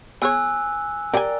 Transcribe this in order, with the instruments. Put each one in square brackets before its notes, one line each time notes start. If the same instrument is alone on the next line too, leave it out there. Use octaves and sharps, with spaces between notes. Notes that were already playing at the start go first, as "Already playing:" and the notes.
[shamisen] B3 G#4 C#5 [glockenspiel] G#5 E6 F#6
[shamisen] G4 G#5 [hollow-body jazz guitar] A#4 D5 G5